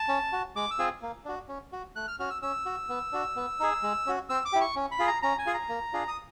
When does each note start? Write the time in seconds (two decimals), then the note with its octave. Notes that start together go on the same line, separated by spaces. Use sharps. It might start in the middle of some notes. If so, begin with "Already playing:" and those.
Already playing: A5
0.08 C#4
0.33 F#4
0.56 G#3 D6
0.71 E6
0.78 C4 F4 G#4
1.02 A#3
1.25 D4 F#4
1.48 C#4
1.73 F#4
1.96 A3 F#6
2.08 F6
2.19 C#4 F#4 F6
2.30 E6
2.42 C#4 E6
2.66 F#4
2.89 B3
3.12 D4 F#4
3.36 B3
3.60 D#4 G#4
3.83 G#3
4.06 C#4 F#4
4.29 C4 E6
4.45 D6
4.53 E4 G4
4.61 C#6
4.76 C#4
4.91 B5
4.99 F4 G#4
5.07 A#5
5.22 C#4 A#5
5.39 G#5
5.46 F4 G#4
5.54 A#5
5.69 A#3
5.93 D4 F4 G#4
6.08 D#6